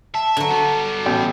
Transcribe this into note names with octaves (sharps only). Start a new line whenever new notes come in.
E5 A5
D3 F#3
G3 B3
A1 B2 G5